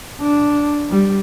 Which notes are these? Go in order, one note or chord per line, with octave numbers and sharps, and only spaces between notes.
D4
G3